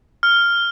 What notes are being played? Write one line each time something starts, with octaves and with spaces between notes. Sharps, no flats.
F6